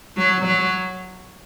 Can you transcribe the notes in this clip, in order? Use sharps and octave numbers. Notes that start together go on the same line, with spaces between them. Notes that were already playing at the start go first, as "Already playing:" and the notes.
F#3
F#3